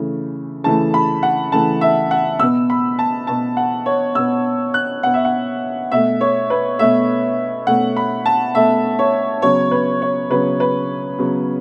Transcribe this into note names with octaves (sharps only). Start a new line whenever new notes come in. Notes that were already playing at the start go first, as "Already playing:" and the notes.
Already playing: C#3 E3 A3
C#3 E3 A3 A5
B5
F#5
C#3 E3 A3 A5
E5
F#5
B2 B3 E6
B5
A5
B2 B3 A5
F#5
C#5
B2 B3 E6
F#6
B2 B3 F#5
E5
F#5
B2 A3 E5
C#5
B4
B2 A3 E5
B2 A3 F#5
B5
A5
B2 A3 E5
C#5
C#3 F#3 B3 C#5
B4
C#5
C#3 F#3 B3 B4
B4
C#3 F#3 B3